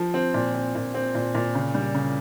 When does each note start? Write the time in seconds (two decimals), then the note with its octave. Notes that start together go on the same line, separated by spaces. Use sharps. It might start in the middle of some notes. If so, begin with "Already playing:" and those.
Already playing: F3
0.14 C4
0.34 A#2
0.54 C4
0.75 A#2
0.94 C4
1.15 A#2
1.35 A#2
1.55 C#3
1.75 G3
1.94 C#3